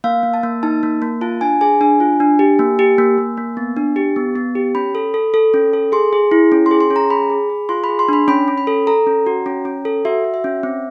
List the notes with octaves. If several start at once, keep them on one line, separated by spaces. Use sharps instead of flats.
A#3 F5
A#3
A5
A#3
D#4 A5
A#3
A#3
F4 A5
D4 G#5
G#4 G#5
D4 G#5
F4
D4
G4
A#3
G4
A#3
A#3
A#3
B3
D4
G4
B3
B3
G4
C#4 B5
A4
A4
A4
C#4
A4
G#4 C6
G#4
E4
C#4
G#4 C6
C6
C#4
A#5
G#4 B5
G#4
G#4
F4 C6
B5
G#4
C6
D4 B5
C#4 B5
C#4
B5
A4
A4 A#5
C#4
F#4
C#4
C#4
A4
F#4 E5
F#4
E5
C#4
C4